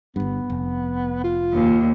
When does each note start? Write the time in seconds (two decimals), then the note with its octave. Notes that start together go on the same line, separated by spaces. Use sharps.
0.16 G1 G2 B3
0.50 F1
1.24 F4
1.53 D#2